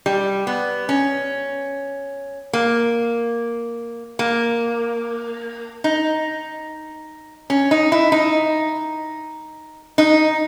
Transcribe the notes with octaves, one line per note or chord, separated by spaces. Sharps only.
G3
B3
C#4
A#3
A#3
D#4
C#4
D#4
E4
D#4
D#4